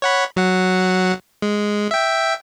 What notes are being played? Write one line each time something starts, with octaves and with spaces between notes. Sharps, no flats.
C#5 F#5 B5
F#3 F#5
G#3
E5 G5